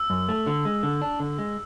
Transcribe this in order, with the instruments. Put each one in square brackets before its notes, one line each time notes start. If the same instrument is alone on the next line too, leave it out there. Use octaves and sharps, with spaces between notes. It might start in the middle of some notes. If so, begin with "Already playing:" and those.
Already playing: [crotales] E6
[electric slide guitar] F#2
A3
D3
G#3
D3
D4
D3
G#3